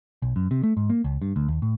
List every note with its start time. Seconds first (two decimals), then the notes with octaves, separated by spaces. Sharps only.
0.22 B1
0.36 F#2
0.51 C3
0.63 A3
0.77 G#2
0.90 A#3
1.04 C#2
1.22 G2
1.36 D2
1.48 D#2
1.62 A2